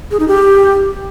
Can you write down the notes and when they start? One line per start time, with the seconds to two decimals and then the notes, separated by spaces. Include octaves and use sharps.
0.11 G#4
0.20 D#4
0.28 G4